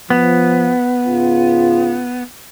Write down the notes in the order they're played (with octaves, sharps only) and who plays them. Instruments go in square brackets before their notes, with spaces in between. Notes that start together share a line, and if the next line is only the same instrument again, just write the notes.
[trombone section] F3 [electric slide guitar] B3
[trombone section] C#2 G#2 F4